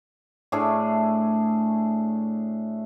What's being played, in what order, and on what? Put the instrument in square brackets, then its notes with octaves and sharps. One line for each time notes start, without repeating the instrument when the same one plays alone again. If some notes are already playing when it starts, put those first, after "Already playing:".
[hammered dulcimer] A2 A3 D4 G#4